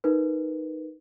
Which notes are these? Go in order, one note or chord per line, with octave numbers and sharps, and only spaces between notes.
D#4 A#4 B4